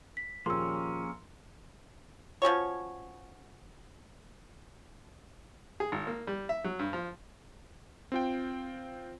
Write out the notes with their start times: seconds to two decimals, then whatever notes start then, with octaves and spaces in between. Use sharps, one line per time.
0.17 B6
0.46 D#2 A#2 F3 A#3 C#4 G#4 C6 E6
2.42 F3 C#4 F#4 C#5
5.80 G#4
5.92 G#1
6.07 A#3
6.27 G3
6.49 E5
6.64 F#3
6.79 G2
6.93 F3
8.12 C4 F4 G5